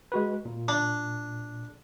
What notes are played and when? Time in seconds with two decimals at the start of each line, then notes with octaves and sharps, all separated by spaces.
0.12 G#3 F#4 B4
0.45 A#2
0.68 D4